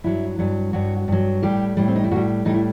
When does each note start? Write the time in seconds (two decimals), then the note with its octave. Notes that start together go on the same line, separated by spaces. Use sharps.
0.04 G2 F#3 E4
0.39 G2 F#3
0.73 G2 F#3 F#4
1.08 G2 F#3
1.42 A2 G3 G4
1.77 A2 G3
1.88 C4
1.95 D#4
2.04 E4
2.11 A2 G3 F#4
2.45 A2 G3 D#4
2.54 E4